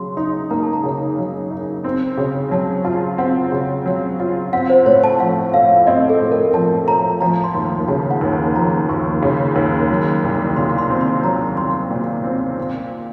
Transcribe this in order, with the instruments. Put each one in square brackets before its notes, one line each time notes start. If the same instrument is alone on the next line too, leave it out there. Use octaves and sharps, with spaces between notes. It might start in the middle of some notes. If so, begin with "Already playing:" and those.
Already playing: [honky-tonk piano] C#3 F#3 [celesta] C6
[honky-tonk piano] D#4 [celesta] C6
[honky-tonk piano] A#3 [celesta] A#5
[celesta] A5
A#5
[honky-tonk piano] C#3
F#3
D#4
C4
C#3
[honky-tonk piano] F#3 [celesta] A5
[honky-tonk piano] F4 [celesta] A5
[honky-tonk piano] C4 [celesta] F#5
[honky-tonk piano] C#3
F#3
F4
[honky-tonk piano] C4 [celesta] F#5
[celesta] C5
[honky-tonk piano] A2 [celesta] C#5
[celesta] A5
[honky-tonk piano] F3 [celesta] F#5
[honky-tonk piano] A2 [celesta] F5
[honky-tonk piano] C4 [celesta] D#5
[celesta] A4
[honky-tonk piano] A2
[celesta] A#4
[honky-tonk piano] F3 [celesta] A5
[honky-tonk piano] A2 [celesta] A#5
[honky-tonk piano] F3 [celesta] A#5
[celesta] C6
[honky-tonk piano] D#2
[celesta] C6
[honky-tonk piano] C#3 [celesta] A5
[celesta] F#5
[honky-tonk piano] D#2
[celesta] A5
[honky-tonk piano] F3 [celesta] A#5
[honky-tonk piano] D#2 [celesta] C#6
[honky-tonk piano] C#3
D#2
F#3
C2
[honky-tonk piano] A#2 [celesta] C6
[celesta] C6
[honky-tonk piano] C4
[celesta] C6
[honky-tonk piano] F#3 [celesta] A#5
[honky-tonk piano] C2 [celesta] C6
[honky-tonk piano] A#2
C4
C4